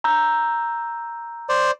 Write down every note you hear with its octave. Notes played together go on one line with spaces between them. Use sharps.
A#5 E6 G6
C5 D5